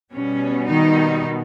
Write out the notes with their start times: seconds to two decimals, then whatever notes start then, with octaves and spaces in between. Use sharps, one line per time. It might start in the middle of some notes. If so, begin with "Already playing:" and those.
0.12 B2 G3 B3 C#4
0.68 D#3 D#4